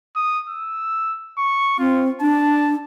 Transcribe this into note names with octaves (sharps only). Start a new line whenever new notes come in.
D#6
E6
C#6
C4 F4
D4 A5